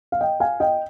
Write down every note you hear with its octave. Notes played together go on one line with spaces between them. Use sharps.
F5
D#5 G5
F5 G#5
D#5 G5